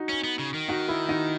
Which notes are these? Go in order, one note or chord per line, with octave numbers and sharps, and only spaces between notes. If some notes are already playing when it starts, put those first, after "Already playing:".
Already playing: D#4 F#4
C#4
B3
C#3
D#3
D#4 F#4
E4
D#4 F#4